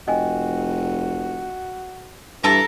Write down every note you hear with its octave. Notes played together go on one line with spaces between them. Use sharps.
F1 F#4 D#5 G5 G#5
G2 E3 A4 A#4 A5 A#5